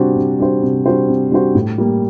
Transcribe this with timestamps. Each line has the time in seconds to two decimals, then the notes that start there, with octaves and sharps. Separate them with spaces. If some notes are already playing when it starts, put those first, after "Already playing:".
Already playing: C3 G3 D4 F#4 C5
0.16 C3
0.39 G3 D4 F#4 C5
0.63 C3
0.86 G3 D4 F#4 C5
1.09 C3
1.32 G3 D4 F#4 C5
1.55 A2
1.78 G3 A#3